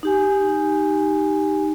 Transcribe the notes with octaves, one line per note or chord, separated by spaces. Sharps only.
D#4 G4 G#5